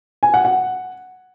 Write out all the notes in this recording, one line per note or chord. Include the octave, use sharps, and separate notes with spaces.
G#5
F#5
F#5